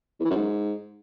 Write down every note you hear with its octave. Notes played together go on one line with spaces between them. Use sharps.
E2
E3
F#2
G#2